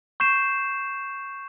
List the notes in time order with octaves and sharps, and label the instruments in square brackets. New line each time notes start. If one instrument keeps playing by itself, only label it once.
[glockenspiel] C#6 G6 C7 E7